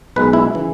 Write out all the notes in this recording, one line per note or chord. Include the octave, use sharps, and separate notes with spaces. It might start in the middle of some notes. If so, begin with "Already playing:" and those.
B1 B2 G#3 B4
E4
C#3 E3